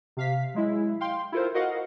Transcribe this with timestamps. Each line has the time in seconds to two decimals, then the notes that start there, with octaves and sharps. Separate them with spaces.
0.17 C3 F5 B6
0.54 F#3 G#3 E4
1.00 F5 G5 C6
1.32 E4 F4 A4 A#4 C5
1.54 F#4 A#4 D#5 F5 F#5